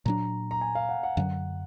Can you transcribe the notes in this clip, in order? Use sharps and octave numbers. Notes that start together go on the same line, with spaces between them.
A#2 F#3 D4 A#5
A#5
G#5
F5
F#5
F#5
F#2 D3 F#3 F#5